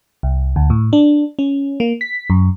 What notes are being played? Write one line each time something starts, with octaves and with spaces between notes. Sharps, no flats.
C2
D2
A2
D4
C#4
A#3
B6
F#2